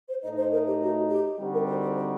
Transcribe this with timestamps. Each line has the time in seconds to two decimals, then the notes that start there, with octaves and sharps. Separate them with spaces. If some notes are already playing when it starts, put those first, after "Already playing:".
0.09 C5
0.23 A2 A3 D#4 D#5
0.38 C5
0.53 A#4
0.67 G4
0.81 F#4
1.09 G4
1.39 D3 G3 C4 D#4 F#4
1.53 A#4
1.67 C5
1.82 C5
1.97 C5